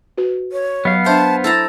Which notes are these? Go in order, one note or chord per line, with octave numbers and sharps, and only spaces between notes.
F#4 B4
C#5
F#3 B3 F5
D4 C5 E5 A5
E4 A4 A5 A#5